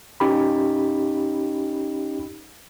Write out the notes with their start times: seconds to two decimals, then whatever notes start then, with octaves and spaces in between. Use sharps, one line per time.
0.20 C#4 D#4 G4 B5